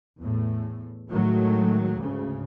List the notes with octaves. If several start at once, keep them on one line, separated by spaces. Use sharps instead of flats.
E2 A2 A3
A2 D#3 F#3 G#3 A3
D2 G#2 C#3